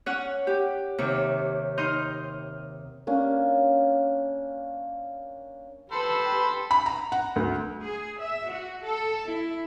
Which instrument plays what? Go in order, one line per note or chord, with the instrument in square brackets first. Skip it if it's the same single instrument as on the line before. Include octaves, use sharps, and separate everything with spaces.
[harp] C#4 C#5 F#5
G4
D#2 C3 C#5
D#4 C6 D#6 F6 G6
[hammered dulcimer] A#3 C#4 D4
[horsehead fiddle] G4 B4 [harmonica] A4 C5 B5
[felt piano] B5
A#5
F#5
D2
[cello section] G#4
E5
F#4
A4
E4